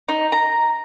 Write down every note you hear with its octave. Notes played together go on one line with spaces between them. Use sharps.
D#4
A#5